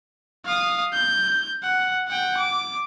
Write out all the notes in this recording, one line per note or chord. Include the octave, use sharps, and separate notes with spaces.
F5 D#6
G6
F#5
F#5 G5
D6